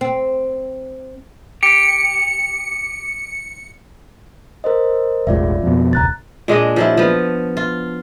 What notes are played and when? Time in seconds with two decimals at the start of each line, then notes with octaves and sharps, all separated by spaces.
0.01 C4
1.63 G4 C#7
4.64 A#4 C5 D#5
5.27 E1 A1 G#3 F4 D5 E5
5.63 F2 B2
5.93 E1 C#2 A#5 F#6 A6
6.48 A#2 G#3 D4 D#5
6.76 F3 F#3 E4
6.97 F3 B3
7.57 F4